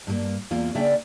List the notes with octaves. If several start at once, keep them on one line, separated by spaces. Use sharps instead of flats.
G2 A#3
E2 A#3 F4
C#3 A#3 D4 D5 E5 G5